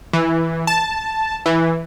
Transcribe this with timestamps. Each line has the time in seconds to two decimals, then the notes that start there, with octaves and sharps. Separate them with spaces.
0.13 E3
0.67 A5
1.46 E3